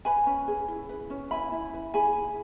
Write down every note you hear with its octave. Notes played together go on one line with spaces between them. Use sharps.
B4 G#5 B5
C#4
G#4
E4
B4
C#4
E4 G#5 B5
E4
B4
G#4 G#5 B5
E4